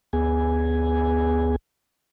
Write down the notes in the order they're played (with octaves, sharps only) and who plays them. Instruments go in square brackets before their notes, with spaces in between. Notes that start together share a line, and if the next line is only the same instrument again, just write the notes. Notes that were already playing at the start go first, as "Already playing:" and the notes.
[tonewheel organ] D2 B3 G#4 G#5